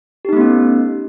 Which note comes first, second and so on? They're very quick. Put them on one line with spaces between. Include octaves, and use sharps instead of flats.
G4 D#4 A3 B3 C#4